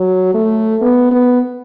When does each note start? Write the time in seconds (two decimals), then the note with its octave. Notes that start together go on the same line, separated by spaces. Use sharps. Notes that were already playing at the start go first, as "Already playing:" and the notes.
Already playing: F#3
0.34 A3
0.81 B3
1.11 B3